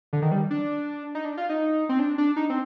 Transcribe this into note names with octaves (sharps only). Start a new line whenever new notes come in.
D3
D#3
G3
D4
D#4
D4
F4
D#4
C4
D4
D4
D#4
C4